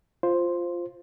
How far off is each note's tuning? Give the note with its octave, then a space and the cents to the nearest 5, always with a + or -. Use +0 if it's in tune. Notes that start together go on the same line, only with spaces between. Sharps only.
F4 +0 C5 +0